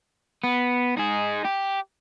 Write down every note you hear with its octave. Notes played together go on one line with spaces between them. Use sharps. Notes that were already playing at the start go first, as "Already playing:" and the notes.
B3
D#4 G#4
G4